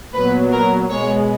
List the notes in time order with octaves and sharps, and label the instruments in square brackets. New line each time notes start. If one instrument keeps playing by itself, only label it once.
[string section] A#2 F#3 B3 B4
A#4
B2 G#3 B3 C#5